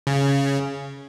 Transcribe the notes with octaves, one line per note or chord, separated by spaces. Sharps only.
C#3